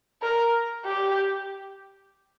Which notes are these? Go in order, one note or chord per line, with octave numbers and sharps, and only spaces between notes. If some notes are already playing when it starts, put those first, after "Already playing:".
A#4
G4